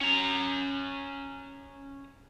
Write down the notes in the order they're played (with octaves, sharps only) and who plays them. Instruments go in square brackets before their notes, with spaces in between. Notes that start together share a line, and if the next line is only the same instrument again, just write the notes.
[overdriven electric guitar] C#4 A#5